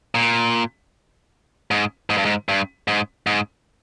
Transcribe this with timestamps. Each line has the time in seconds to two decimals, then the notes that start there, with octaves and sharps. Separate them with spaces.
0.15 A#2
1.71 G#2
2.10 G#2
2.17 G2
2.25 G#2
2.49 G2
2.88 G#2
3.27 G#2